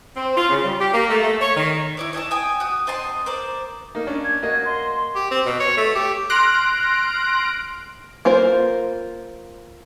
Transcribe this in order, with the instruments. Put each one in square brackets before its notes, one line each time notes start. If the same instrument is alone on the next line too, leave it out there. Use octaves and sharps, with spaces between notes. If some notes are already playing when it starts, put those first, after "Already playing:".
[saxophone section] C4
F4
C#3
G3
G4
A#3
A3
A3
C#5
D#3
[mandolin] E4 C#5 D5
C#5 D#5 G#5 A5
G5 G#5 D#6
F#4 D#6
C4 D#5 A5 C6
A#4 C5 D5
[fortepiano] A#3 D#4
C#4 D4
[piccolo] G#6
[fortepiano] A#3 F#4 D#5
[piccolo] C6
[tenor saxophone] G4
C4
B2
C#5
A3
G4
[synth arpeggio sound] C6 F6 F#6 A#6 D7
[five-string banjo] A#3 F4 A#4 C5